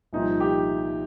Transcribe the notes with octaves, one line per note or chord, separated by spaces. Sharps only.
C2 A#2 F3 D#4
G4